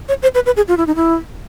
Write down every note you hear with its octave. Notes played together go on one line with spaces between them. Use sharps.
C#5
C5
B4
B4
G#4
F4
E4
D#4
E4